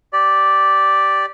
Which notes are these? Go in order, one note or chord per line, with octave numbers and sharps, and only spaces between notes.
G4 D5